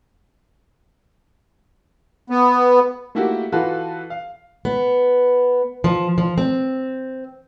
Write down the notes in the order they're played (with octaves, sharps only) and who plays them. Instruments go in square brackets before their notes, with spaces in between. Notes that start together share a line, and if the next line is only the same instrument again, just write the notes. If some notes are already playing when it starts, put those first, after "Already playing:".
[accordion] B3
[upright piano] A3 A#3 E4 F#4 G4
E3 F4 F#4 A4 B4
F5
[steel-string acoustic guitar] B3
F3
F3
C4